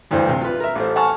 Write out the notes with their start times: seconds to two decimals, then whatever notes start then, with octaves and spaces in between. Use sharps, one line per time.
0.11 D2 G2 E3 C5
0.29 C3
0.41 F4 B4
0.60 A#4 E5
0.75 A1 A3 C5
0.96 F#5 G#5 A5 C#6 F6